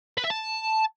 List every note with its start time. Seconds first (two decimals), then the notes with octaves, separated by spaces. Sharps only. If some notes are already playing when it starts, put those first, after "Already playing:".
0.17 B4
0.24 E5
0.30 A5